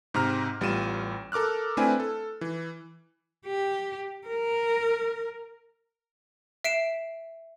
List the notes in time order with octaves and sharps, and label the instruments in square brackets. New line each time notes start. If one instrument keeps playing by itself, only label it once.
[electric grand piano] G#2 C3 A#5 F6
A1 G3 B3 F4 D#7 E7
A4 A#4 D6 F6 F#6
A3 C4 D4 E4 B4 G#5
A4
E3
[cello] G4
A#4
[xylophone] E5 C7 D7 E7